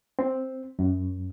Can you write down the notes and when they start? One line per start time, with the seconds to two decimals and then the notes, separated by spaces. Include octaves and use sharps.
0.19 C4
0.79 F#2